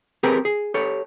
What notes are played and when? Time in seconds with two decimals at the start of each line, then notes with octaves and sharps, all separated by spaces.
0.23 C4 G4 G#4 A#4 B4 G5
0.45 G#4
0.74 G4 A4 C#5